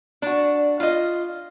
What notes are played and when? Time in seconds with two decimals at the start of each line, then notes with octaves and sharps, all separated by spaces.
0.22 D4 F#4
0.80 F4 D#5